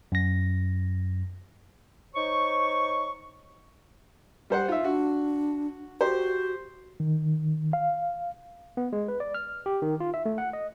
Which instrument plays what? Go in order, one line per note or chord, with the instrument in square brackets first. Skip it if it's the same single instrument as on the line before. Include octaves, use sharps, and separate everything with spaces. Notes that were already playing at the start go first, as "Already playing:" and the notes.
[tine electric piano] F#2 A#6
[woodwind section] D#4 C5 C#5 C#6
[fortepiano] G3 C5 F#5
[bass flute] D#4 [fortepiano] F4 E5
[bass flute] D4 [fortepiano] F#4
[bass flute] F#4 [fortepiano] G4 C5
[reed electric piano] D#3
F5
[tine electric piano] B3
G#3
B4
D5
F6
G4
D#3
F4
E5
A3
F#5
D#5